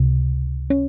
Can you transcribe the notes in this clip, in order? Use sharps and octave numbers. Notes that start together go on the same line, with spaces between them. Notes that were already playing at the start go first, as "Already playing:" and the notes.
Already playing: C#2 C3
C#4